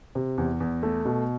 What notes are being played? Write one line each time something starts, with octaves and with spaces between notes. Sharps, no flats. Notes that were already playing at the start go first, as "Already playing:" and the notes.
C3
E2
E2
A3
B2